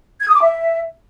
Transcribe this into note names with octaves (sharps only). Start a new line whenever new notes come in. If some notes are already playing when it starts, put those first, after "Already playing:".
G#6
D#6
D6
E5